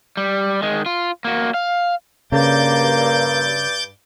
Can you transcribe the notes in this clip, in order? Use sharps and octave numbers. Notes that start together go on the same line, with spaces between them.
G3
D#3 G#3
F4
A#3 F#4
F5
G2 C#3 A#3 D6 G6 A6